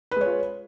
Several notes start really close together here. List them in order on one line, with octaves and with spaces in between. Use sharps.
B4 G#3 C#5 F4